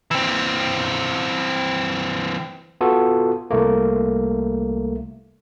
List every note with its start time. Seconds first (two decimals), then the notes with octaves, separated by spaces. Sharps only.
0.11 E3 C4
2.81 B3 F4 F#4 A4
3.51 C2 A3 A#3